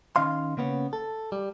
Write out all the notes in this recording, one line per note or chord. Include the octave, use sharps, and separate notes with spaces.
D#3 C#4 D#5 F5 C6
C#3 A#3 B3 C#4
A4
G3